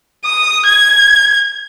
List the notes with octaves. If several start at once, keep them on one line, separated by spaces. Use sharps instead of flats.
D#6
G#6